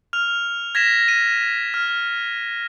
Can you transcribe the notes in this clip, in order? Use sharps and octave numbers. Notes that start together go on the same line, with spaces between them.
F6 F7
G#6 A#6 B6 E7
D#7
F6